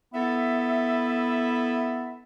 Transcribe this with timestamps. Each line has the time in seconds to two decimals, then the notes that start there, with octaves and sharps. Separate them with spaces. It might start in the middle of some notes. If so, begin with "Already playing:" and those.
0.14 B3 E4 A4 E5